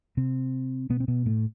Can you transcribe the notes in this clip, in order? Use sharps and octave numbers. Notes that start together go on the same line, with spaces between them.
C3 C4
B2 B3
C4
B2 B3
A2 A3